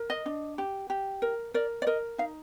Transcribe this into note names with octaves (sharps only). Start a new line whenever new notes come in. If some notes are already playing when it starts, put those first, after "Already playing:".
Already playing: A#4
D#5
D4
G4
G4
A#4
A#4 D5
D5
A#4 D#5
D#4 F5